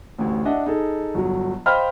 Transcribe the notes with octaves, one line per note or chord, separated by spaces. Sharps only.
A1 D2
D4 D#5 E5 F#5
D#4 G#4 A4
G1 F#3
C5 D#5 F5 G5 B5 F6